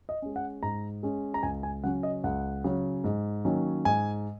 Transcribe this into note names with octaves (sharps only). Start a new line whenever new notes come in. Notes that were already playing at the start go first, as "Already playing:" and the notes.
D#5
G#3 C#4
F#5
G#2 A#5
G#3 C#4
A#5
C#2 G#5
G#5
C#3 F#3 C#4 F#5
D#5
C#2 F#5
C#3 F#3 C#4
G#2
D#3 F#3 A#3 C#4
G#2 G#5